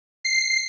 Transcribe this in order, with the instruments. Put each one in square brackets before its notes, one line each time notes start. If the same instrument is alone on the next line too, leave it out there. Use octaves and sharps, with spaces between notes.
[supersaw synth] C7